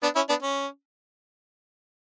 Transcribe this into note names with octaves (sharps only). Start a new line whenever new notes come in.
B3 D4
C#4 E4
B3 D4
C#4